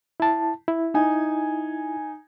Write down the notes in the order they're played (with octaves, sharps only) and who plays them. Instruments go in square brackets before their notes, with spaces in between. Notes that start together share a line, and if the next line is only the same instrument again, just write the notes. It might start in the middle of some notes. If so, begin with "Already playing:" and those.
[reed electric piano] E4 A5
E4
[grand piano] D#4 G#5